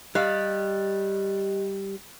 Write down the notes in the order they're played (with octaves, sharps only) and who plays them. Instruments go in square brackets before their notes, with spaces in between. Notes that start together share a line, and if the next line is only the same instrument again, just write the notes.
[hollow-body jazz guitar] G3 F5 [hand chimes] G4 D#5 F#6